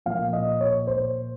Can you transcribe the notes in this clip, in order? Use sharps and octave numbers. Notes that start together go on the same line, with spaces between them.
A#2 F3 F5
D#5
C#5
C5